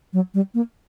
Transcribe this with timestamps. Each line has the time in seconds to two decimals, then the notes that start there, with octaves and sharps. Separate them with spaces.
0.13 F#3
0.34 G3
0.54 A#3